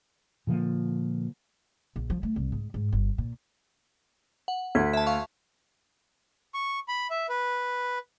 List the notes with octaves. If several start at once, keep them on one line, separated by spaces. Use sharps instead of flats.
A#2 D3 F3 A#3
A#1
F3
A3
C2
G#2
G#2
G1
A#2
F#5
D2 G#6 B6
E5 A5
F5 C#6
C#6
B5
E5
B4